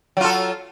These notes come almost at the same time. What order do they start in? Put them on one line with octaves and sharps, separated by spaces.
F#3 F4 A4